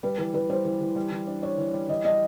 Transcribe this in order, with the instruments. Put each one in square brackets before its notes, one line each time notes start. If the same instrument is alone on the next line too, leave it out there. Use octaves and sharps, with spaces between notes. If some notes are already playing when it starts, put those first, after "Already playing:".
[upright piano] G3 [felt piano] B4
[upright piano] E3 [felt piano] B4
[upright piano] E3 [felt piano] B4
[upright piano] G3 [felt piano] C5
[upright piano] E3
E3
G3
E3
D4
[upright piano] D4 [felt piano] C#5
[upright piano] E3
G3
[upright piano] E3 [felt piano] D#5
[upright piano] G3 [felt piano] D#5